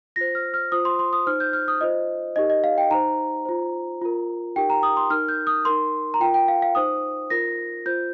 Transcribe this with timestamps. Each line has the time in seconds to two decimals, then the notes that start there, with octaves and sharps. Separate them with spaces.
0.16 F4 C5 A#6
0.35 F6
0.54 F6
0.72 F4 C5 D#6
0.85 C6
0.99 C6
1.13 D#6
1.26 D#4 C5 F6
1.40 G6
1.53 F6
1.68 D#6
1.81 F4 C5 D#5
2.36 D#4 G4 A#4 D#5
2.50 D#5
2.64 F5
2.78 G5
2.91 D#4 C5 A#5
3.45 F4 C5
4.02 F4 A#4
4.56 D#4 G4 A#4 G5
4.70 A#5
4.83 D#6
4.97 C6
5.10 D#4 A#4 F6
5.29 G6
5.47 D#6
5.65 D#4 A#4 C6
6.14 A#5
6.20 F4 A#4 G5
6.34 G5
6.48 F5
6.62 F5
6.75 D#4 C5 D#6
7.30 F4 A#4 A#6
7.86 F4 C5 G6